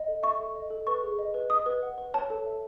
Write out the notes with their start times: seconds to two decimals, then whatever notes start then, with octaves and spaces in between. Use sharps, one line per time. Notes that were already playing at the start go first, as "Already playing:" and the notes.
Already playing: D#5
0.08 A4
0.23 E5 C#6
0.40 A4
0.56 D#5
0.70 A4
0.87 B4 C#6
1.03 G#4
1.19 D#5
1.34 B4
1.50 D#5 D#6
1.66 B4
1.83 F#5
1.98 B4
2.14 C#5 A5
2.30 A4
2.46 E5